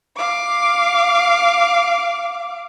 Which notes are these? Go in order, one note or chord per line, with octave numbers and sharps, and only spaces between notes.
F5 D6